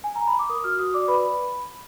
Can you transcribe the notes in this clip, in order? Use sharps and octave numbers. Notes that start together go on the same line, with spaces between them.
G#5
A#5
B5
D6
A#4 D#6
F#4 F6
F#4 D#6
D5 D6
B4 B5